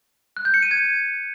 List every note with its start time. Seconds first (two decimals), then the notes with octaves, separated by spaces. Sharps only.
0.37 F#6
0.45 G6
0.54 C#7
0.62 D#7
0.71 G#6